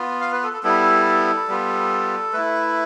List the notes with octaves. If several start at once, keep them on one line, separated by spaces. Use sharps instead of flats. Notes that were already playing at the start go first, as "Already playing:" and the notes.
Already playing: B3 F4
F5
B4
A4
A4
G3 B3 E4 A4
G3 B3 F4
A3 E4 B4